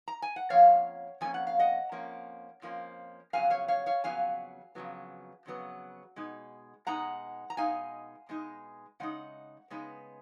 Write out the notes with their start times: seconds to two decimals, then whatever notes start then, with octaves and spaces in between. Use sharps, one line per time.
0.08 A#5
0.22 G#5
0.36 F#5
0.50 F2 F3 A#3 C#4 C#5 F5
1.21 F2 F3 A#3 C#4 G#5
1.34 F#5
1.47 F5
1.59 D#5 F#5
1.92 F2 F3 A#3 C#4
2.62 F2 F3 A#3 C#4
3.33 F2 C#3 F#3 B3 F5 G#5
3.50 C#5 F5
3.68 C#5 F5
3.86 C#5 F5
4.04 F2 C#3 F#3 B3 F5 G#5
4.75 F2 C#3 F#3 B3
5.46 F2 C#3 F#3 B3
6.16 B2 G#3 D#4
6.87 B2 G#3 D#4 F#5 A#5
7.50 A#5
7.57 B2 G#3 D#4 F5 G#5
8.29 B2 G#3 D#4
9.00 C#3 G#3 D#4 F#5
9.70 C#3 G#3 B3 D#4